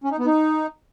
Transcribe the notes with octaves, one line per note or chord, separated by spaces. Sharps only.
C#4
D#4
B3
D#4